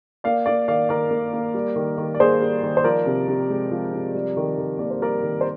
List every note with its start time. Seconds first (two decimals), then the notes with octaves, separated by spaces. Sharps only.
0.24 A#3 D5 F5
0.46 A#3 D5 F5
0.68 D#3 D5 F5
0.89 D#3 A#4 D5
1.11 A#3
1.33 A#3
1.54 G3
1.76 D#3
1.98 D#3
2.15 D5
2.20 A#3 G#4 C5
2.42 G3
2.63 D#3
2.77 C5
2.84 F3 A#4 D5
3.06 C3
3.28 C3
3.49 G#3
3.71 F3
3.94 C3
4.14 G3
4.37 D#3
4.58 D#3
4.79 A#3 D5
4.91 C5
5.01 G3 A#4 D5
5.23 D#3
5.41 C5